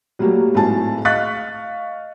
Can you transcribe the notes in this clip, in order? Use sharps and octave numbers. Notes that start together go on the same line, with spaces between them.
F#3 G3 A3 A#3 F#4 G4
G#1 A2 A3 F#4 G#4 A5
D#5 F5 C#6 F#6 A6 B6